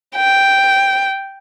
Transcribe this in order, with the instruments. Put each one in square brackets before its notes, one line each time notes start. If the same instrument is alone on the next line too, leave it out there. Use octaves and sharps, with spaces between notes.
[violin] G5